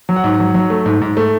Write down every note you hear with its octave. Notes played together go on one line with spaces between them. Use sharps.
F#3
F#5
G#2
F#3
F#3
A3
G#2
G#2
A3